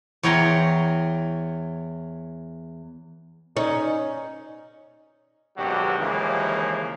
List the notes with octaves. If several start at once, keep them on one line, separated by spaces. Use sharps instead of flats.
E2 C#5 G5 A#5 C6
C#4 D#4
G#1 G2 B2 F#3 F#4 G4
D#2 C#3 E3 F3 G#3 A#3